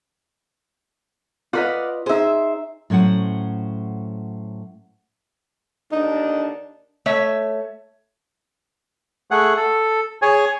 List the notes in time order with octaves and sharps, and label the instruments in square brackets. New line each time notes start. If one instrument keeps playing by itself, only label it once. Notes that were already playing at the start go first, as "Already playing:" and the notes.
[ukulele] F4 B4 D#5 [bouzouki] D5 F5 F#5
[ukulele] D#4 G#4 [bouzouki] C5 E5
[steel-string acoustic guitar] A2 F#3 C#4 C5 F#5
[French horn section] D#2 D3 D4 [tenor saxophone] D#4
[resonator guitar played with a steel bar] A3 C#5 E5
[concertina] A3 G#4 F#5
A4
G#4 C#5 G#5